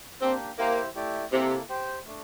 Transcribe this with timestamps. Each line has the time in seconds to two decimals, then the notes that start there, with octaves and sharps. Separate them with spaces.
0.21 A#3 C4 D4 G4
0.58 A#3 E4 G4 C5 G5
0.95 A3 E4 G4 D5
1.32 C3 A#3 E4 A4
1.69 G4 C5 G5
2.06 A3 D4